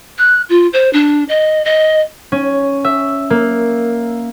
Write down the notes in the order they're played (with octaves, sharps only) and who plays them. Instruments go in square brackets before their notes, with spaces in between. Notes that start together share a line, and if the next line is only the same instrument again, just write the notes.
[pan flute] F#6
F4
C5
D4
D#5
D#5
[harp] C#4
E5
A#3